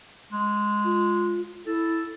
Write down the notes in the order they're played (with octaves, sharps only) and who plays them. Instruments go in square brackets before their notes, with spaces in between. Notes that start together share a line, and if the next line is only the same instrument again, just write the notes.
[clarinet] G#3
[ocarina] F4
[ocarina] E4 [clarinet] A4